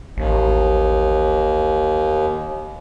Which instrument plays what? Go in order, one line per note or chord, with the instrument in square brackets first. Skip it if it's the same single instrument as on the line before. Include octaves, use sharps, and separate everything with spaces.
[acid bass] A1 [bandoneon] D#2